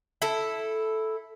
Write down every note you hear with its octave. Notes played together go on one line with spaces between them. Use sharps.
E4 A4